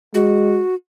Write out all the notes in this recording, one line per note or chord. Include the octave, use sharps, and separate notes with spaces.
G#3 F#4